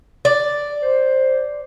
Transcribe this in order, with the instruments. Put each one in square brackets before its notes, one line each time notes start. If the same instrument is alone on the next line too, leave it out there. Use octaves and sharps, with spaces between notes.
[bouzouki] D5
[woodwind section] C5